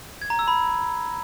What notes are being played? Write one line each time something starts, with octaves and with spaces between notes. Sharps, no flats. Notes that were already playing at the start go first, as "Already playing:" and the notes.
G#6
A#5
E6
B5